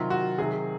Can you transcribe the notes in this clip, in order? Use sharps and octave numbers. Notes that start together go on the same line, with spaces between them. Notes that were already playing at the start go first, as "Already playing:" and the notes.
Already playing: C3 D#3 F#3 F4
F#4
C3 D#3 F#3 G#4